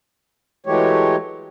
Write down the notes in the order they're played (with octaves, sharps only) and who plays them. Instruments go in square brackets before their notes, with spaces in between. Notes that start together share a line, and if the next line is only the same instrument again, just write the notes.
[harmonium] E3 F#3 G#3 A3 G4 C#5